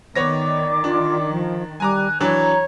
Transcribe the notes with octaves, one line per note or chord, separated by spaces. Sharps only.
D#3 B3 C#5 D5 D6 A#6
D4 F4
F3
G3 G#5 A#5 D6 F#6
E3 F#3 D4 C#5 A#5